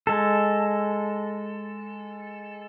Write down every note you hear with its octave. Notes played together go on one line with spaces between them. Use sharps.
G#3 A4